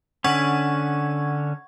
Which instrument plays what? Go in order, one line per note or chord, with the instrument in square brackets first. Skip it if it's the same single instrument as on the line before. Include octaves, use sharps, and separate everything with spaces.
[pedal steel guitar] D3 C#4 [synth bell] F#5 C#6 G#6